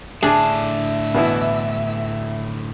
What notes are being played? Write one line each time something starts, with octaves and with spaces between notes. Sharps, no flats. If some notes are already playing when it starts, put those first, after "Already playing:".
A2 D3 D4 G#4 E5
B2 E3 E4